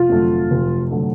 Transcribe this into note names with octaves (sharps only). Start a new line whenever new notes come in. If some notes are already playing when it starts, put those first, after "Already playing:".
Already playing: F1 F4
F2 D3 F#3 A3
F1
D3 F#3 A3